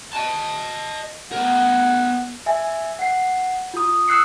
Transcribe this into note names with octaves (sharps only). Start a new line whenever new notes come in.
D#5 A5
B3 A#4 F#5
E5 G#5
F#5 C7
F4 D#6
D#6 E6 F#6 C7 C#7